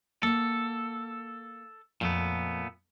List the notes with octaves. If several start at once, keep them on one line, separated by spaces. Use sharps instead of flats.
A#3 A4 F#5
F2 A#2 A3 B3